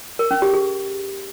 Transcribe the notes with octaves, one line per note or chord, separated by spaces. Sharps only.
A#4
C#4
G4
G#4